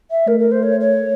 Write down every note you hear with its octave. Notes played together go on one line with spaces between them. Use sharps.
E5
A3 A#4
A#4
C5
C#5
C#5